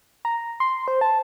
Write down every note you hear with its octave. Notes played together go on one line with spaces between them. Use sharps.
A#5
C6
C5
A5